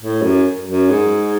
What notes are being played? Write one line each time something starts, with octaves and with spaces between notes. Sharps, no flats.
A2
F#2
F#2
G#2